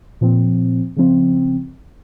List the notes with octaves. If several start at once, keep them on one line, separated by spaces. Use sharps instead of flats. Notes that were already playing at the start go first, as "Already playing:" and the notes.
A#2 F3 C4
C#3 F3 C4